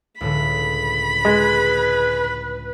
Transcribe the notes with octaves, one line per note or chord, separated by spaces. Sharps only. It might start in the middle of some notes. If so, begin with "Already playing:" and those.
C#2 A2 D3 B5
G#3 B4